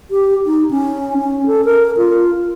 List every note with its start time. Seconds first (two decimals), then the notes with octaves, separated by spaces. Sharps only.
0.11 G4
0.46 D#4
0.71 C#4
1.18 C#4
1.47 A4
1.65 A#4
1.97 F4